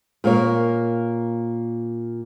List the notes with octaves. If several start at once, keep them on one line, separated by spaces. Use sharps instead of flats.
A#2 A#3 C#5